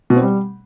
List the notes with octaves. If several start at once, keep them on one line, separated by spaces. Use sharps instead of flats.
B2
C4
G3